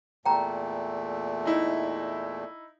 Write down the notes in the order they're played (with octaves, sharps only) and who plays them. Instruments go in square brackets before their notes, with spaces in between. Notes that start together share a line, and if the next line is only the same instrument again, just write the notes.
[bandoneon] E2 A#2 A3 [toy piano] G5 A#5
[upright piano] D#4 E4